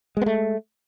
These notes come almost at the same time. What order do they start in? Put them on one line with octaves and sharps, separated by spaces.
G#3 B3 A3